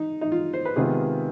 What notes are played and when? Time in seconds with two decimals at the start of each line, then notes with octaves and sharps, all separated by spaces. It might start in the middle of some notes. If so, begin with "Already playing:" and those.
Already playing: D#4
0.21 D#4
0.32 F4
0.53 C5
0.65 B4
0.76 C3 D#3 G#3 B3 F4 G#4